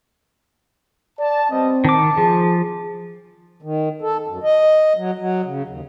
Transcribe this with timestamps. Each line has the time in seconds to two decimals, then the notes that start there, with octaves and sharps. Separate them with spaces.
1.19 D5 A5
1.51 G3 B3 C4 D#5
1.84 D#3 A5 D6
2.18 F3 G#4
3.62 D#3
4.02 A4
4.27 F#2
4.44 D#5
4.96 F#3
5.18 F#3
5.45 C#3
5.67 D#2